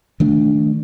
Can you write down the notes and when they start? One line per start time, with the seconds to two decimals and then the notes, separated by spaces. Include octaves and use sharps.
0.20 D#3 A3 D4